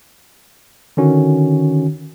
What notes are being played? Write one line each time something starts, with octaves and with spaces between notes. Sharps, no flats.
D3 D#3 C#4 F#4